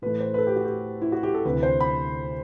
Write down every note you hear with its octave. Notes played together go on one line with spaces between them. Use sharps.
A2 E3 A3 B4
C5
B4
A4
G4
F#4
G4
E4
F#4
G4
A4
D2 C3 E3 B4
C5
B5